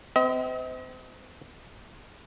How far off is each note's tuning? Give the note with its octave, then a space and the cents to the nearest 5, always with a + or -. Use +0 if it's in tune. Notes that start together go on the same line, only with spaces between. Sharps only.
C4 -35 D#5 +40